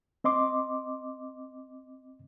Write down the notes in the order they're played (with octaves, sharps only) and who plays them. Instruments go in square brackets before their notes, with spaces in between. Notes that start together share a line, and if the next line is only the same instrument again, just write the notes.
[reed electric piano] C4 D#5 C6 D6